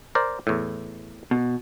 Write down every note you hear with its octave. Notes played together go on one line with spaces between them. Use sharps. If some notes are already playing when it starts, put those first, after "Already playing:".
A#4 C5 D5
E2 A2
B2